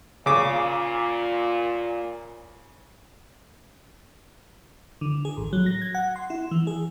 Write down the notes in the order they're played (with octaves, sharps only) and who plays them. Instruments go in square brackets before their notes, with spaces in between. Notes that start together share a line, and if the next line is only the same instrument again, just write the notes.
[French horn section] A#2 [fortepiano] C#3 D6
[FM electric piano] D3
G#4
A1
F#3
A#6
G#6
F#5
C6
E4
E3
G#4